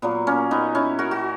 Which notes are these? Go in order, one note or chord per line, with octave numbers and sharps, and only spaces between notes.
A#2 F#3 A#3 B3
A#3 C#4
B3 D#4
C#4 E4
F#4 A#4
F#4